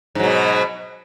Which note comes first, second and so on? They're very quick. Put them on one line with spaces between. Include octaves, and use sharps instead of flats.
G#2 F#3 B2